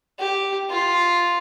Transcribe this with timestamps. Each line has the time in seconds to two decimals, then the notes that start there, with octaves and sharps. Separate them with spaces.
0.19 G4
0.70 F4